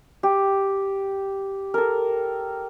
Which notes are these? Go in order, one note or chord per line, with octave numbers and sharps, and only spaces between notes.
G4
A4 A#4